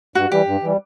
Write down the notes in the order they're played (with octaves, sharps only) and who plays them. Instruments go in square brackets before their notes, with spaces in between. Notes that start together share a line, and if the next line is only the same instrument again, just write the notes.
[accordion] G2 [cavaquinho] F#4
[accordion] E3 G3 [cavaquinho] G4
[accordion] G2
E3 G3